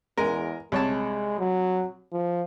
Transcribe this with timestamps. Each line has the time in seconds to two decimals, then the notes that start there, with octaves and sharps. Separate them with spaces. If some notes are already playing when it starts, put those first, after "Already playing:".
0.17 E2 G#3 A#4
0.72 C2 G#3 C#5 A5
1.39 F#3
2.13 F3